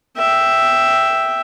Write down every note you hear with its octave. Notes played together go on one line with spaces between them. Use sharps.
E5 G5